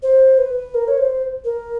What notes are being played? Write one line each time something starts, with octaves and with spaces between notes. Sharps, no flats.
C5
B4
A#4
C#5
C5
A#4